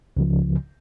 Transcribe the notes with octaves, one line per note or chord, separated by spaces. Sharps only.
C#2 C#3 F3